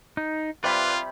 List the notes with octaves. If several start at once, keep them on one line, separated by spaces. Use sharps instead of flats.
D#4
C3 G3 F4 B4 D5 B5